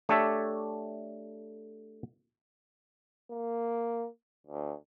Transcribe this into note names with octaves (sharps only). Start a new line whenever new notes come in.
A3 D4 G4 A4 C#5 E5
A#3
D2